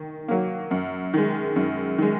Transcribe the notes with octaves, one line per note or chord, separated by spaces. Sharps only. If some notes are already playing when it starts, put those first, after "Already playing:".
Already playing: D#3
F#3 A#3
F#2
D#3 G#3
F#2
D#3 G#3